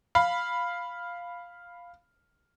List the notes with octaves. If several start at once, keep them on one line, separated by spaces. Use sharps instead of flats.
F5 B5